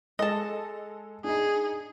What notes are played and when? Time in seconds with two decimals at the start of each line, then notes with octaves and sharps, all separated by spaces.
0.19 G#3 A4 D#5 A5
1.24 D4 D#4 G#4